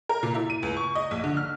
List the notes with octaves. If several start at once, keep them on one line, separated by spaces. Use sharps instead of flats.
A#4
A#2
E4
D#7
C#2
C#6
D#5
A#1
D3
F6